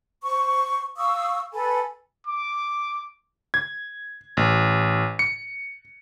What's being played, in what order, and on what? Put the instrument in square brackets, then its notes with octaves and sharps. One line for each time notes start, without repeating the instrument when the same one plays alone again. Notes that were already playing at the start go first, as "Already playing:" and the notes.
[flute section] C5 C#6
F5 C#6 D#6 E6
A4 B4 G#5 B5
[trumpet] D6
[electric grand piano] G#6
A1
C#7